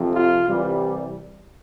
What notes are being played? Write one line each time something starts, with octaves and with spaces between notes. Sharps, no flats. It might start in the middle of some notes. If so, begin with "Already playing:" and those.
Already playing: F2 C3 F3
F4
C2 C3 E3 G3